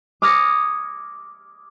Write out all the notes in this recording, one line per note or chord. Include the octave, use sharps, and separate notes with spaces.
D6 D#6 F6 G#6 A#6 C#7